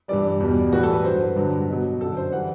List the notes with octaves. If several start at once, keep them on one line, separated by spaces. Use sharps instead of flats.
G2 E3 G3 D5
E2 B2 G3
A2 E3 G3 F#4
A4
B4
G2 F#3 C5
B4
G2 D3 F#3
B2 F#3
F#2 D3 F#3 A4
C5
E3 G3 F#5